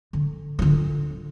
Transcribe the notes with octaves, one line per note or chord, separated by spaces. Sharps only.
D3
D3 F4